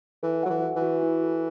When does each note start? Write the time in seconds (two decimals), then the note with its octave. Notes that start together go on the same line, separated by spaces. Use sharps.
0.23 E3 A4
0.43 F#3 F#5
0.49 E3
0.63 F#4
0.76 E3
0.82 F#4
1.03 E4
1.23 A4